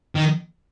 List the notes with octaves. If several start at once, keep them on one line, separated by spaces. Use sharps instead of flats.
D#3